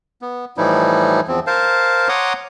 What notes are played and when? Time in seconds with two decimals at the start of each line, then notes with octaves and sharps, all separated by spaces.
0.22 B3
0.57 A2 E3 F3 G3 D#4 E4
1.28 E2 F3 C4
1.47 A#4 C5 F5 A5
2.09 C#5 F#5 A#5 C6 D6 D#6